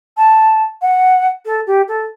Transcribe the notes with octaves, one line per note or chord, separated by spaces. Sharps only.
A5
F#5
A4
G4
A4